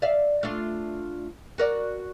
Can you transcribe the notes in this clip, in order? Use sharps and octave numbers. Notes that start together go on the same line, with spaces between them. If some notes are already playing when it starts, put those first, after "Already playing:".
D5 E5 F5
A3 D4 F4
F#4 A#4 D5